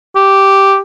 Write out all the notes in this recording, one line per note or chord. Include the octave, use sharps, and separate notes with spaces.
G4